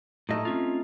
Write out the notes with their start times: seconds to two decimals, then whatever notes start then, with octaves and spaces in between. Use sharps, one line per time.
0.29 A2 A3 D#4 D#5
0.45 C4 C#4 F4